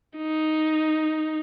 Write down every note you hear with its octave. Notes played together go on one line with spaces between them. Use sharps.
D#4